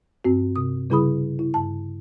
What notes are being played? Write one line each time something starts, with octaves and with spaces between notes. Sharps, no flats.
G2 C4 F#4
C3 D#6
C#3 G3 E4 G#4 B5 D#6
E4
G2 A5